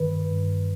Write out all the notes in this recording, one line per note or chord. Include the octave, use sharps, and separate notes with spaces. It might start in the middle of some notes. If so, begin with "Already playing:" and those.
Already playing: G2 D#3 B4
G2